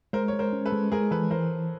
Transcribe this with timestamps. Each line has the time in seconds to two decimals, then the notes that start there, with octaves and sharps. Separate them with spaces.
0.13 G#3 A#4 C5
0.28 G#3 C#5
0.39 A#4 C5
0.53 C#4
0.66 A4 B4
0.72 G#3
0.92 G#3 G#4 A#4
1.11 E3 A4 B4
1.31 E3 A#4 C5